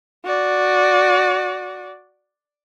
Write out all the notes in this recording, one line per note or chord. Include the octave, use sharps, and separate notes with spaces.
F#4 D5